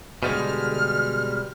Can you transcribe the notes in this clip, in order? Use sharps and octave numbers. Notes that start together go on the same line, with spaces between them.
B2 D3 G3 G#3 F6